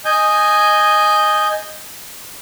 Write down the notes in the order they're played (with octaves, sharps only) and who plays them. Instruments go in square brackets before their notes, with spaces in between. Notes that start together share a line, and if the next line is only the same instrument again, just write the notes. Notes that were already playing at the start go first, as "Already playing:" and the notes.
[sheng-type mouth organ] D#5 G#5 G6